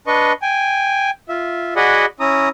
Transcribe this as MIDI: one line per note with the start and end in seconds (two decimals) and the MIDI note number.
0.07 0.33 62
0.07 0.33 71
0.07 0.33 75
0.07 0.33 85
0.42 1.10 79
0.42 1.10 80
1.29 1.74 65
1.29 1.74 76
1.76 2.05 66
1.76 2.05 68
1.76 2.05 74
1.76 2.05 75
1.76 2.05 78
1.76 2.05 83
2.20 2.49 61
2.20 2.49 64
2.20 2.49 82
2.20 2.49 87